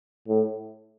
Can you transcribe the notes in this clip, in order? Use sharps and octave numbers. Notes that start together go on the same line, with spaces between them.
A2